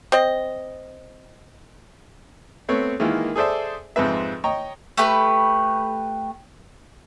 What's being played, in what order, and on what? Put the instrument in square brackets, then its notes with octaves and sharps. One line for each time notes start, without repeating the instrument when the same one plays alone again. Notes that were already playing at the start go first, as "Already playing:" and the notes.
[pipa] C4 D#5
[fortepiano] A3 B3 C4 C#5
D#3 E3 G#3 A#3 E4 F4
G#4 A4 C5 D5 E5
F2 G#2 F3 C4 B4 E5
C#5 D#5 G5 A#5 C#6
[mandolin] A3 G4 B4 B5